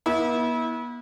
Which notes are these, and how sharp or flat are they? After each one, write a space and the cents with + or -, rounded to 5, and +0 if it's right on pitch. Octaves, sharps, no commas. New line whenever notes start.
B3 -45 E4 -30